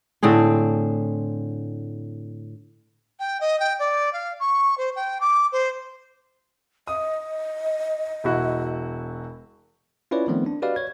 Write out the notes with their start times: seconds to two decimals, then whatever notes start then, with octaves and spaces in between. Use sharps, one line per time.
0.23 A2 D3 C4 G#4
3.19 G5
3.40 D#5
3.59 G5
3.79 D5
4.13 F5
4.39 C#6
4.77 C5
4.95 G5
5.20 D6
5.52 C5
6.87 D#5 D#6
8.24 E1 E4 F#4
10.11 C#4 E4 F4 B4 C#5 D5
10.28 D#3 F3 A3 B3 C4
10.46 D4
10.62 F#4 G4 B4 D5 D#5 F5
10.76 C#5 G#6